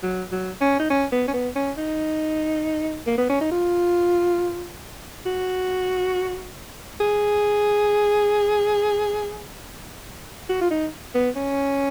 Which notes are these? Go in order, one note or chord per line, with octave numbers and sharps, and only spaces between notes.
F#3
F#3
C#4
D#4
C#4
B3
C#4
B3
C#4
D#4
A#3
B3
C#4
D#4
F4
F#4
G#4
F#4
F4
D#4
B3
C#4